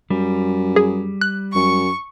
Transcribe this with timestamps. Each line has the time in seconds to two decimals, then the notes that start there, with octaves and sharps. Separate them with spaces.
0.11 F#2 G3
0.76 G#4
1.21 F#6
1.55 F#2 C#6